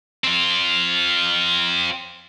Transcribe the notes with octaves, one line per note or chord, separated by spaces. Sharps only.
C4 F4